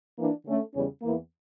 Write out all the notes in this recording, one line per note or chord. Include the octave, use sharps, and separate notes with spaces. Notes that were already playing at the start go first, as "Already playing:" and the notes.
E3 A#3 D4
D3 A3 C#4
E2 C#3 G3 C#4
E2 E3 A#3